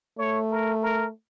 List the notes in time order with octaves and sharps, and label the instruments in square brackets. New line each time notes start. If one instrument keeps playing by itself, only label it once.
[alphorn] A3 [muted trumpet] C#5
[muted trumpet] A#4
A#4